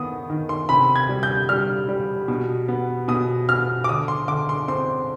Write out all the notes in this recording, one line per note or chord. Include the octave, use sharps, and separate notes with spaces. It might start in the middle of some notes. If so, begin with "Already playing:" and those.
Already playing: D#3 B3 D#6
D#3
C6
C3 B5
G#6
G3
G6
G3 F6
G3
B2
B3
B2 D#6
B3 F6
D6
D3 D#6
C6
D3 D6
C6
C4 C6